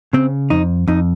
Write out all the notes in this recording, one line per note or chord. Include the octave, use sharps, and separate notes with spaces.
C#3 C4
F2 D#4
F2 D#4